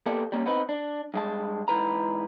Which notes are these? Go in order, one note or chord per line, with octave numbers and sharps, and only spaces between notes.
A#3 B3 G4 A4 D5
G3 A#3 C#4
B3 C4 D#4 B4
D4
G2 G#3 A5
G#2 E3 B4 A#5